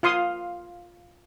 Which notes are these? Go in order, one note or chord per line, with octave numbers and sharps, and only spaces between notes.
F4 F5 C6 D#6